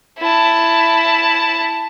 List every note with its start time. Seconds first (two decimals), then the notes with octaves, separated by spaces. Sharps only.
0.19 E4 A5